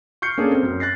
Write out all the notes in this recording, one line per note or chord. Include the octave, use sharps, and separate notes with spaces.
C#6 F6 G6 C7 C#7
A#3 C#4 D4 G#4 A4
C4
F#2
F#6 A6 A#6 C7